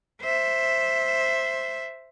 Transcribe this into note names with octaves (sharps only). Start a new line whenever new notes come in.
C5 E5